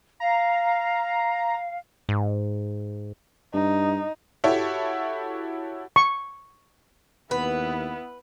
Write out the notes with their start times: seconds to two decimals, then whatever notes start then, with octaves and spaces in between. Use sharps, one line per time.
0.20 F5 A#5
2.09 G#2
3.54 G2 D#4
4.44 E4 F#4 G4 A4 C#5 E5
5.96 C#6
7.31 D#2 B3 E4 B4